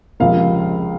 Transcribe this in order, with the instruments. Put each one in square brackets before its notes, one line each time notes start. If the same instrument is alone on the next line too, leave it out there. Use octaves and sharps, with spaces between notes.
[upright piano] C#2 C3 F3 A#3 F5